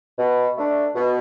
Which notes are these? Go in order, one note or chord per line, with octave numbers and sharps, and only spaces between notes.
B2
A3 D4
B2